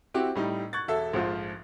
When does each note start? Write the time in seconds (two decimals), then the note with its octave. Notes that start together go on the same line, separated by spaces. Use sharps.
0.14 C4 E4 F#4 G4
0.35 A2 G3 D#4
0.73 C#6 F#6 G#6 A6
0.88 E1 A4 E5
1.13 A#1 G#2 F3 F4